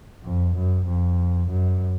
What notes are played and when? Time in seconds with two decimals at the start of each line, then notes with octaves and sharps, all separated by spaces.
0.24 F2
0.56 F#2
0.86 F2
1.49 F#2